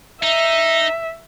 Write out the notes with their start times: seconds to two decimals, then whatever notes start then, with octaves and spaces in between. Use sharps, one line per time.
0.23 D#4 E5